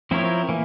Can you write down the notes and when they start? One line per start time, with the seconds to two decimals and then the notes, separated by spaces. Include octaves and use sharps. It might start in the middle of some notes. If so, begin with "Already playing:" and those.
0.11 F3 C4 E4 A#4 C#5
0.49 E3 A#3